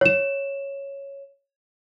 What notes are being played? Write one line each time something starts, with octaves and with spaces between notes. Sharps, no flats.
C#5 E7